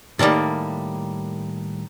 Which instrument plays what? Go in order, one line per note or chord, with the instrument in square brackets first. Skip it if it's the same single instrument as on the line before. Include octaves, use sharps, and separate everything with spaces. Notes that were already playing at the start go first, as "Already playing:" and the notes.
[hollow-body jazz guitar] A2 D#3 F#3 G3 A#3